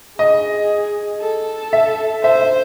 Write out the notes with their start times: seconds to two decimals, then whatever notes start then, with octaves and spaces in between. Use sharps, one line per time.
0.19 G#4 D#5
1.21 A4
1.73 E5
2.24 C5 E5
2.41 E5